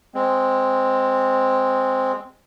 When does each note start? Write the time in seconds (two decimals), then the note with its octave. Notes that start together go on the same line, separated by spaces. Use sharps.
0.14 G#3 C4